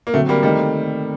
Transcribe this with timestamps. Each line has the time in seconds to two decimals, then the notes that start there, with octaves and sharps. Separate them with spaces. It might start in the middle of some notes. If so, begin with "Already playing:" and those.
0.07 A#3
0.14 D3 F#3 A3 C4
0.29 G3 A#3
0.43 D#3 G3 A3 A#3 C4 D#4